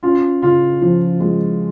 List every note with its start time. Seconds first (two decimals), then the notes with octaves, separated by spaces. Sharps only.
0.03 C#4 F4
0.42 C#3 F4
0.81 F3
1.20 G#3